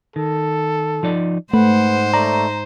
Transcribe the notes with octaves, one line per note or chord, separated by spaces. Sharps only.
D#3 A4
F3 D#4 D5
G#2 A3 B4 C5 F#5
A3 D5 A#5